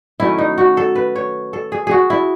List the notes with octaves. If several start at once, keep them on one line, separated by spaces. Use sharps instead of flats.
D#3 F#3 A3 C#4 E4
D#4
F#4
A4
B4
C#5
A4
G#4
F#4 G#4
E4